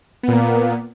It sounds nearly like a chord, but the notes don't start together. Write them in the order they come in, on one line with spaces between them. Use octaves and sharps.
B3 A#2 A#3